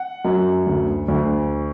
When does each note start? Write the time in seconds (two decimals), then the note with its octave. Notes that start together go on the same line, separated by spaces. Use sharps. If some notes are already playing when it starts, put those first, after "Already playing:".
Already playing: F#5
0.25 F#2
0.67 D2
1.08 D2